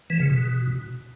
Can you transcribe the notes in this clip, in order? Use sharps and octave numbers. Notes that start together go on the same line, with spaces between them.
E3
C#3
B2